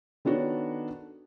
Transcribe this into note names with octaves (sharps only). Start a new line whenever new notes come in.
D#3 B3 D4 F#4 A4 C#5